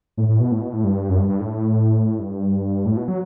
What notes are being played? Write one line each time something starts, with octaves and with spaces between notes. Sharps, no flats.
A2
A2
B2
A2
B2
A2
G2
F#2
G2
G2
A2
G2
A2
B2
F#3